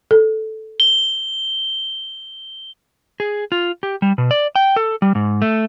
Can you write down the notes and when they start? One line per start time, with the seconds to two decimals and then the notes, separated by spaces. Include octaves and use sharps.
0.11 A4
0.80 G7
3.20 G#4
3.52 F4
3.83 G4
4.02 G3
4.18 B2
4.31 D5
4.56 G5
4.76 A4
5.02 G3
5.15 G#2
5.42 A3